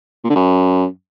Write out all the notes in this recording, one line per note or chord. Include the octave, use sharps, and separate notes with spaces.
A#2
D3
F#2